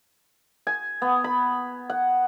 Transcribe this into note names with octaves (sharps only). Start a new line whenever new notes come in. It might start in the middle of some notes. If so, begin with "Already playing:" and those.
G#5
B3
B5
F#5